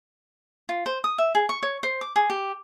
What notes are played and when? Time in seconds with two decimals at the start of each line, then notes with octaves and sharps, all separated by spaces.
0.69 F4
0.86 C5
1.04 D#6
1.18 E5
1.35 G#4
1.49 C#6
1.63 C#5
1.83 C5
2.01 D6
2.16 G#4
2.30 G4